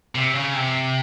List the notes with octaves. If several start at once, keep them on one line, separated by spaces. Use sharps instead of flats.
C3
C#3
C3